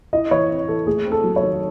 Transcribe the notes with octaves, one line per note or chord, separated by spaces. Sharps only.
E4 D#5
E3 C#5
C4
E3 A4
A3 G#4
C4
A4
F#3
C#5
D#3